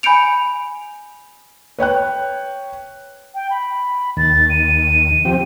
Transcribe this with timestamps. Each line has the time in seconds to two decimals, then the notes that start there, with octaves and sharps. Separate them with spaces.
0.03 G#5 B5 G6 C#7 D7 F7
1.78 B4 C#5 G5 F#6
3.34 G5
3.50 B5
4.17 D#2 A6
4.49 D#7
5.25 F3 C4 G4